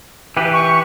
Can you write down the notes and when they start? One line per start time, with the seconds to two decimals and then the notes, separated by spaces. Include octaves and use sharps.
0.37 E3 G4 B4
0.53 C#6